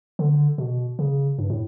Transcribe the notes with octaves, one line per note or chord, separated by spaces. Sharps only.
D3
B2
C#3
G2
A2